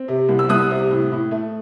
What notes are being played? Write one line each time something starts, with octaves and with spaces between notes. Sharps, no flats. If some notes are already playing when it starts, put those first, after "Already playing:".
Already playing: C4
C3
C2
E6
C2 D#6 F#6
C3
A2
A2
A3